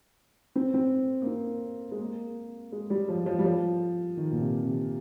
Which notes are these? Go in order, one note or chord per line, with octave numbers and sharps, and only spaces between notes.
C4
C4
A#3
C4
G#3
A#3
G#3
G3
F3
F3
G3
F3
D#3
A#2
C3
C3